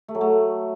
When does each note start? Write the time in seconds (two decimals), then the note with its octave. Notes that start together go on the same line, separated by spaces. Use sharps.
0.08 A3
0.15 F#3
0.21 A3